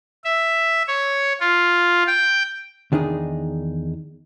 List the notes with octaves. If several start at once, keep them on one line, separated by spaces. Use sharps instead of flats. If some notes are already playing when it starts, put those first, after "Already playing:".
E5
C#5
F4
G5
E2 D#3 D4 D#4 G#4